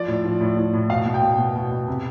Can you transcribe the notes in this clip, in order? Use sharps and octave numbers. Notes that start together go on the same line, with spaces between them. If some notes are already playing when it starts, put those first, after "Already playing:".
Already playing: F3 D5
A2
F3
A2
A2
A2
B2 F5
B2
G5
B2
B2
B2
B2
C3